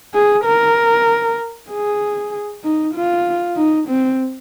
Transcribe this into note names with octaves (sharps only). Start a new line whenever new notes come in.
G#4
A#4
G#4
D#4
F4
D#4
C4